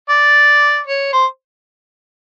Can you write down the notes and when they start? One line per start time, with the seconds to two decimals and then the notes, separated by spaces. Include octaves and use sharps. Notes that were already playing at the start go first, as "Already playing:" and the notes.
0.09 D5
0.87 C#5
1.13 C5